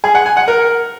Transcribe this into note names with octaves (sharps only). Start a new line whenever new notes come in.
G#4
F#5
G#5
F#5
A#4